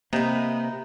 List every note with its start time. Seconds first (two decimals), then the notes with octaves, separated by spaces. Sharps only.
0.13 C3 A#3 B3 D#4